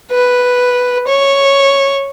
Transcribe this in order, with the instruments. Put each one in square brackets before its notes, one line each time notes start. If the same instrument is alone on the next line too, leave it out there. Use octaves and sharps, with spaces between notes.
[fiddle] B4
C#5